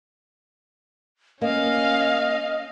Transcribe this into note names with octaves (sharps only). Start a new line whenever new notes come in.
A#3 C#4 D#5 F5